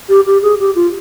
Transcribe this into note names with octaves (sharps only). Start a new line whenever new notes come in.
G4
G4
G#4
G4
F4